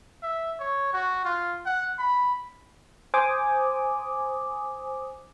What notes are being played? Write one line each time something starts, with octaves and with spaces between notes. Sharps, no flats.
E5
C#5
F#4
F4
F#5
B5
C5 G#5 D6 D#6